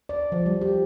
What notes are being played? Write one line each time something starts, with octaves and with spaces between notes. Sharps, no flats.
D5
F3
G3
G4